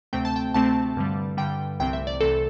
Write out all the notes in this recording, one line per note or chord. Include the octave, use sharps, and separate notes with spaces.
D2 C3 A3 C4 G5
A5
G5
D2 C3 A3 C4 A5
G2 D3 G3
G2 D3 G3 G5
C2 C3 E3 A3 C4 G5
E5
D5
C2 C3 E3 A3 C4 A4